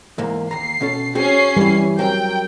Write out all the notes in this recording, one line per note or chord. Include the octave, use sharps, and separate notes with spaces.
E2 G#2 A#3
D#2 A#5 C7
B2 C#4 A4
C4 C#4 F#4 G#4 C7
E3 G3 E4
F#3 C4 A#4 G5